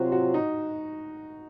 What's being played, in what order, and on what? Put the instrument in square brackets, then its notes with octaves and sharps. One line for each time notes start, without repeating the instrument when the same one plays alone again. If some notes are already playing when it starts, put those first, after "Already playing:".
Already playing: [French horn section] C3 F#3 C4 F4 [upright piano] F#4
[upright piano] F#4
D#4